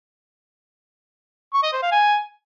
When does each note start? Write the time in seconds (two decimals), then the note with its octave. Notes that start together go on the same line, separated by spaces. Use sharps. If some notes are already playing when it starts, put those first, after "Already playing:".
1.54 C#6
1.63 D#5
1.73 C5
1.82 F5
1.92 G#5